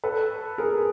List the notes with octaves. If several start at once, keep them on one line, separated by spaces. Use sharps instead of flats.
A4 B4
G#4 A#4